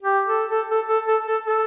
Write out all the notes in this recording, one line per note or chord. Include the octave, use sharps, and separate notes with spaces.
G4
A4
A4
A4
A4
A4
A4
A4